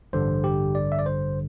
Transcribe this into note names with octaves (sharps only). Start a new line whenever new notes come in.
A1 G2 D3 G3 C5
G4
D5
E5
D5
C5